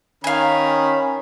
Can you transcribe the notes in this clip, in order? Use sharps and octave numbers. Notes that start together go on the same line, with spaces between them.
D#3 C#4 A#4 F5 G#5 B5